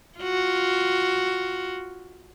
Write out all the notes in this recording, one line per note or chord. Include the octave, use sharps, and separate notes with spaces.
F4 F#4